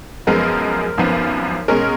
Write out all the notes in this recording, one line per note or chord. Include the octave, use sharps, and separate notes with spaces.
F#2 F3 G#3 B3 A#4
G#1 F#2 F3 B3
B2 G#3 C#4 A#4